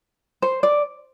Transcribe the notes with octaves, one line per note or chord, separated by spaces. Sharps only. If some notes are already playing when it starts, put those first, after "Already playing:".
C5
D5